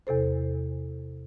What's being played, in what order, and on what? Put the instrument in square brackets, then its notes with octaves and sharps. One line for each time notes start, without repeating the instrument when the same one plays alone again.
[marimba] E2 C3 A4 C5